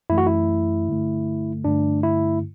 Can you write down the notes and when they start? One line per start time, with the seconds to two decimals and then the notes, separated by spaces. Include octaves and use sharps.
0.10 F#2 E3 A3 E4
0.18 F#4
0.27 E4
0.87 G2 D3 A3
1.65 G2 D3 A3 D4
2.03 E4